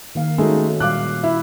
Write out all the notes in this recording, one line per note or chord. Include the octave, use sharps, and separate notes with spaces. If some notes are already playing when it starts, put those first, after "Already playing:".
D#3 A#3 F5
G#3 A3 C#4 D#4 F#4
A#2 G3 F5 D6 F#6
E4 E5